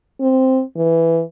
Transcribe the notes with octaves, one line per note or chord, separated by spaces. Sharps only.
C4
E3